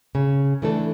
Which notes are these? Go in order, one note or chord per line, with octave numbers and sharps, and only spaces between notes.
C#3
E3 A3 D4 A4